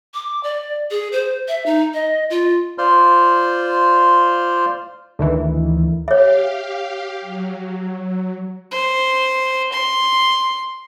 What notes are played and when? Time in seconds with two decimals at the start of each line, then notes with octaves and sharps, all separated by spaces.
0.14 D6
0.43 D5
0.91 G#4
1.12 C5
1.48 E5
1.66 D#4
1.94 D#5
2.30 F4
2.78 F4 C5 D5 C6 F6
5.19 D2 D#3 E3
6.08 G4 C#5 E5 F5
7.21 F#3
8.71 C5
9.72 C6